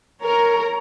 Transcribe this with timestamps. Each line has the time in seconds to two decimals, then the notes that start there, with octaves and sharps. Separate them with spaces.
0.22 A#4 C#5 A#5